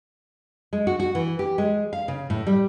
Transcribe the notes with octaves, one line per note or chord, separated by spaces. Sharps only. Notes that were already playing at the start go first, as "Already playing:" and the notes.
G#3
F#4
F#4
E3
G4
G#3
F5
C#3
A2
G3